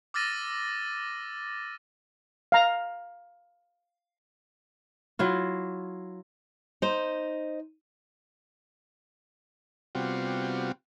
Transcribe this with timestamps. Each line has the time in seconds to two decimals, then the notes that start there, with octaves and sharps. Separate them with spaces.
0.14 D6 E6 F6 A6 A#6 D#7
2.52 F5 A#5
5.19 F#3 E4 F4
6.82 D#4 C5
9.95 C3 G3 B3 C4 F4 F#4